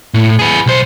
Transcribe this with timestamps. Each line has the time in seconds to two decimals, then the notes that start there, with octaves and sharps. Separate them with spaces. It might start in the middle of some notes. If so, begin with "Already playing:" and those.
0.14 A2
0.39 G#4 B4
0.66 B1 C5